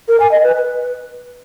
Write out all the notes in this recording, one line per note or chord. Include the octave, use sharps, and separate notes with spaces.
A#4
G#5
D#5
B4
B4